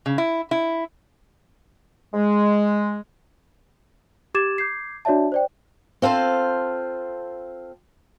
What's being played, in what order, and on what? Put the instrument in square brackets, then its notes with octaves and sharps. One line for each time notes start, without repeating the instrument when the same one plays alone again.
[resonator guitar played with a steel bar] C#3
E4
E4
[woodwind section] G#3
[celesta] G4 D6 G#6 A6 E7
D6 G6 G#6 C7
D4 F#4 C#5 D5 E5 A5
C5 D5 G5
[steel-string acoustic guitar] C4 F4 A4 C5